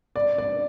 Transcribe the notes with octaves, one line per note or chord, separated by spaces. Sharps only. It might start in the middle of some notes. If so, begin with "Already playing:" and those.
D5
D5